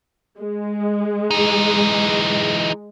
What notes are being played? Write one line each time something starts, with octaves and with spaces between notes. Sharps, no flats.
G#3
E3 D#4